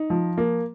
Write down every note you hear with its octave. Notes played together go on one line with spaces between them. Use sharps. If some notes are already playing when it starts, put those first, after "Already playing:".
Already playing: D#4
F3
A#3